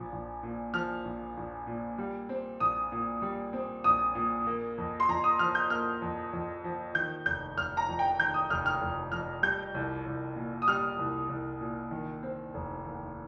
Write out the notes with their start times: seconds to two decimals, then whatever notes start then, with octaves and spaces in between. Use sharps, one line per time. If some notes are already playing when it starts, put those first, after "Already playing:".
Already playing: A#1 F3
0.12 A#1
0.43 A#2
0.74 F3 F6
1.05 A#1
1.37 A#1
1.67 A#2
1.98 G3
2.29 C4
2.60 A#1 D#6
2.92 A#2
3.22 G3
3.53 C4
3.84 A#1 D#6
4.15 A#2
4.47 A#3
4.78 F2
5.00 C6
5.08 F2 A#5
5.24 D#6
5.39 F3 F6
5.55 G6
5.70 A#3 F6
6.02 F2
6.33 F2
6.64 F3
6.95 D#3 G6
7.26 F1 G6
7.57 F1 F6
7.77 A#5
7.88 F2
7.99 G5
8.19 D#3 G6
8.34 D#6
8.50 F1 F6
8.66 F6
8.81 F1
9.12 F2 F6
9.43 G3 G6
9.74 C2
10.06 C2
10.36 A#2
10.62 D#6
10.68 G3 F6
10.99 C2
11.29 C2
11.61 A#2
11.91 D#3
12.23 C4
12.54 F1
12.85 D#2